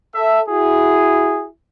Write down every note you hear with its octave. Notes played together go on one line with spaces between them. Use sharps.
A4 E5
E4 F#4 G#4